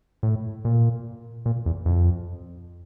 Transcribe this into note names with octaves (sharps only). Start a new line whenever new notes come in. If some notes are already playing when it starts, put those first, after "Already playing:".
A2
A#2
A#2
E2
F2